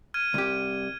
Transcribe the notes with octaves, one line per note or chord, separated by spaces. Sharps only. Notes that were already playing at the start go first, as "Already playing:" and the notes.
F6 G#6 D#7
C2 G4